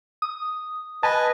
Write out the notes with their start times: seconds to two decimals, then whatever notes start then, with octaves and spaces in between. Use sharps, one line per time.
0.22 D#6
1.03 B4 D#5 G#5 A5